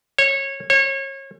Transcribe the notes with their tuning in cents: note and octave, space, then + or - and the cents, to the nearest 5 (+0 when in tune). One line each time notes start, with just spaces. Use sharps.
C#5 -20
C#5 -30